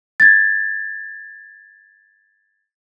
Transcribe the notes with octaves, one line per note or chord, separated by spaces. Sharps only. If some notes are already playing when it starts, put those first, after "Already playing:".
G#6 A6